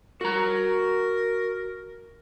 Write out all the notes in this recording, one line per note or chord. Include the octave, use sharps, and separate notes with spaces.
F#4 A#4 A#5